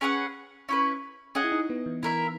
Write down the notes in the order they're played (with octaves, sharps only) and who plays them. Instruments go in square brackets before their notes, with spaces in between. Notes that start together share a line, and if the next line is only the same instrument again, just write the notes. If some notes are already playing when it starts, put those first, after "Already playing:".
[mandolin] C#4 G#4 B4 F#5
C#4 E4 B4
[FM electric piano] C#4 [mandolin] G#4 D#5 F#5
[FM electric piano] E4
D#4
B3
E3
[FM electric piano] E3 [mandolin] E4 A#4 E5